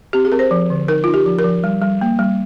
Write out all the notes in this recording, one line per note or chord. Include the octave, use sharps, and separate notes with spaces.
C4 G4
G#4
C4 A#4
C5
F3
D3
D#4 A#4
D#4 F4
G4
F3
A#4
F3
G3
G3
A#3
G3